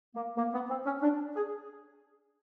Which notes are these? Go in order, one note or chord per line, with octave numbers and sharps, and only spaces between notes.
A#3
A#3
B3
C4
C#4
D4
G#4